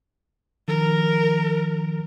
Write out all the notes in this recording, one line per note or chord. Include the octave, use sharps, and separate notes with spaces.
D#3 F3 A#4